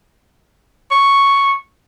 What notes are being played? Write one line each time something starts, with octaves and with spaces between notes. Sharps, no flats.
C#6